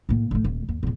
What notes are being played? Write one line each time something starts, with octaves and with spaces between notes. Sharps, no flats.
A2 A#3
A1 A3
D#1
D#2
E2 A2